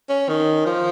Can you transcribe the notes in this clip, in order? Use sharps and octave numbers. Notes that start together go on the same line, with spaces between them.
C#4
D#3
F3